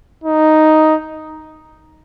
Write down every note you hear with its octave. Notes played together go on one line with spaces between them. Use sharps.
D#4